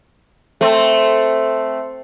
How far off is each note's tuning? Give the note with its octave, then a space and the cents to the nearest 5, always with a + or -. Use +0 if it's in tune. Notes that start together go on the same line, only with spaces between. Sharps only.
A3 +0 C4 +0